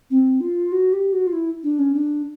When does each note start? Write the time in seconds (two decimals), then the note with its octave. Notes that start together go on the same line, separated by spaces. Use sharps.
0.10 C4
0.40 F4
0.72 F#4
0.93 G4
1.12 F#4
1.27 F4
1.33 E4
1.63 D4
1.79 C#4
1.94 D4